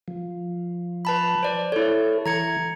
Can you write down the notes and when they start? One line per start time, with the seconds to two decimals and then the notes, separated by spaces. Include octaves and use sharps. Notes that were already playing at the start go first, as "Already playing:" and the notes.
0.08 F3
1.05 B4 A5 B5
1.43 C5 D5
1.72 E4 A4 C#5
2.26 E3 A#5 G#6 C#7